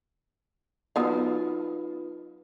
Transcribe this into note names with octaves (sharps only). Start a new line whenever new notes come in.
F#3 B3 D#4 F4 B4 F5